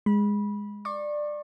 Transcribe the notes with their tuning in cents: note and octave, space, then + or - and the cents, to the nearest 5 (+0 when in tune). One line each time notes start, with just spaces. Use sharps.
G#3 -10 B5 -20
D5 +15 C#6 -30